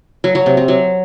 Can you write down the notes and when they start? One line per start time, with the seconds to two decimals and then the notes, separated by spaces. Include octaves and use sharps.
0.24 F#3
0.35 F#3
0.46 C3
0.57 C3
0.68 F#3